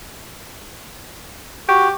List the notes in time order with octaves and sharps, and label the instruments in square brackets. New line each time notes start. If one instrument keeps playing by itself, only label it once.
[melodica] F#4 [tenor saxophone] G4